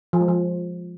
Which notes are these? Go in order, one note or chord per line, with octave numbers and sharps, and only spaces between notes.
F3
G#3
F3